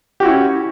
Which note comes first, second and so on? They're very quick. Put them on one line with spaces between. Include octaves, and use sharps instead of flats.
G4 F#4 E4 C#4